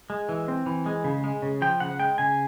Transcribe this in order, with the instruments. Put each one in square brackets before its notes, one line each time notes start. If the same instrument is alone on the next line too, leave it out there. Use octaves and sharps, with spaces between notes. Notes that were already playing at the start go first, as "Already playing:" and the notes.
[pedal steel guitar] G#3
E3
C4
E3
G#3
C#3
G#3
C#3
F3 G5
C#3 F#5
G#3 G5
C#3 G#5